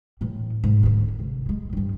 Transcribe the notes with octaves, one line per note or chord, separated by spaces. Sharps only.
A2 E3
G#2
D3 C#4
G#1 C3
A2 G#3
G2 F3